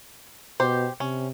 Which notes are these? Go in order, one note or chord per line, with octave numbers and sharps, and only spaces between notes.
B2 G4 C5
C3 C#4